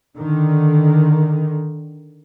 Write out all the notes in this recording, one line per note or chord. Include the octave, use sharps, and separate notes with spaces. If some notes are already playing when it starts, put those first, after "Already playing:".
D3 D#3